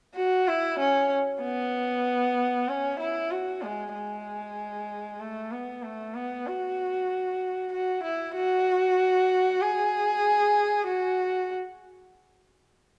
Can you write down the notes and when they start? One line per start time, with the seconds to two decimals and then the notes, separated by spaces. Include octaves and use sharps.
0.15 F#4
0.48 E4
0.79 C#4
1.43 B3
2.69 C#4
3.00 E4
3.31 F#4
3.62 G#3
3.94 G#3
5.20 A3
5.52 B3
5.83 A3
6.14 B3
6.47 F#4
7.72 F#4
8.03 E4
8.35 F#4
9.61 G#4
10.87 F#4